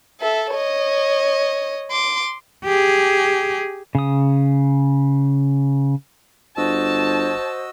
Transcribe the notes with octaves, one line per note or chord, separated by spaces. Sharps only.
A4 E5
C#5 D#5
C6 D6
G4 G#4
C#3 D#6
G1 F#4 C5 D#5 A5 E6